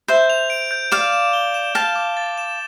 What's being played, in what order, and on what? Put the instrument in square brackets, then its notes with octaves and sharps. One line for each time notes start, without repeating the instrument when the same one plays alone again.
[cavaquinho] C5 E5 [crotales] G6
[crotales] F7
D7
G6
[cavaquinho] D5 F5 [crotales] E7
[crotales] E7
G7
E7
[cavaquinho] F5 A5 [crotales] E7
[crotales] D6
A6
E7